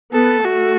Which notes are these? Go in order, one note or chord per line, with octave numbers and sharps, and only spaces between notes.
B3 A4
A3 F#4